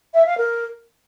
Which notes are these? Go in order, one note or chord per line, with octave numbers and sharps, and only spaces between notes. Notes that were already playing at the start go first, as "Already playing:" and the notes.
E5
F5
A#4